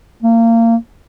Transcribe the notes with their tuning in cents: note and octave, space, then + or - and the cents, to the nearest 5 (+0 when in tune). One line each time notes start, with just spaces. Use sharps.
A#3 -25